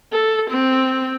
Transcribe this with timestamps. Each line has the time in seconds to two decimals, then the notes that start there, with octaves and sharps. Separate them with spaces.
0.12 A4
0.51 C4